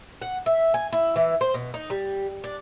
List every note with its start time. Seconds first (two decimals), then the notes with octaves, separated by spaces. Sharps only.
0.22 F#5
0.46 E5
0.74 G#5
0.92 E4
1.16 E3
1.41 C5
1.54 B2
1.74 D#4
1.90 G3
2.44 D4